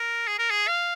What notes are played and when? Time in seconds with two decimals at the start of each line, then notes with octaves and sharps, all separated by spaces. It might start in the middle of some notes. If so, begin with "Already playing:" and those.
Already playing: A#4
0.27 G#4
0.39 A#4
0.50 G#4
0.68 F5